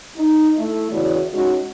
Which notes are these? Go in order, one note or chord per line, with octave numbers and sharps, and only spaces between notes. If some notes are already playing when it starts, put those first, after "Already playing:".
D#4
A3 E4
E2 C#3 E4 F#4 C#5 D5
G#3 C#4 D#4 F#4